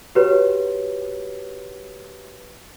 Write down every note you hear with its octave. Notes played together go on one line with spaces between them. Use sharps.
F#4 G4 B4 C#5